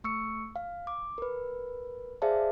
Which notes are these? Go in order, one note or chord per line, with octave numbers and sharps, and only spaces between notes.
A3 C#6 E6 C#7
F5
D6
A#4 B4
G#4 C5 D5 E5 F5 A5